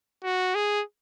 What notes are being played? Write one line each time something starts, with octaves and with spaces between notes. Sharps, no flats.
F#4
G#4